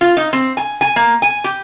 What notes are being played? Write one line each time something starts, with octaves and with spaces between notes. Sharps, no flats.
F4
D#4
C4
G#5
G#5
A#3
G#5
G4